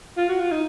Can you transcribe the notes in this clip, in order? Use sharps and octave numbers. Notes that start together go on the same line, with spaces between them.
F4
F#4
F4
D#4